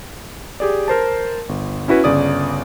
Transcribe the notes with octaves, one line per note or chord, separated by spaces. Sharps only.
G4 G#4 D5
A#4 C5 A5
G1
C#4 E4 F#4 B4
G1 C#3 D5 D#6